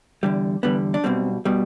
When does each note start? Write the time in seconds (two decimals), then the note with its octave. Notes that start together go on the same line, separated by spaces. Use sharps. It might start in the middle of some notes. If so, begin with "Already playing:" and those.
0.23 E2 D3 G3
0.63 E2 D3 G3 B3
0.94 D4
1.04 B1 B2 G3 C4
1.45 B2 G3